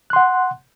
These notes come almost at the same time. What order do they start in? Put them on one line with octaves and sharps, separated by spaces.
F#6 C6 F#5